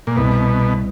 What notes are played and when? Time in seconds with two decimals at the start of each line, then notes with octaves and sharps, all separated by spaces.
0.07 A#2
0.17 C2 B2